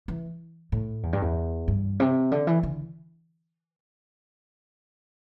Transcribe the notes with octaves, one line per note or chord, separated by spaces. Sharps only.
E3
A2
E2
G2
E2
G2
C3
D3
E3
D3